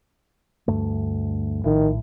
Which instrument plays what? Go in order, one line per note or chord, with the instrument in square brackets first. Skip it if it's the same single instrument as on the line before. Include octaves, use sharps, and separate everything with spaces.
[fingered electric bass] D2 G2 A3
[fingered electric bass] A#1 A2 [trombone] D#3